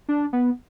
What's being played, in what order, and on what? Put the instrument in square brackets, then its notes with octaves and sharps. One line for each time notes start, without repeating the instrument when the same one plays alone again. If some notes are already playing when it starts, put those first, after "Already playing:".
[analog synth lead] D4
B3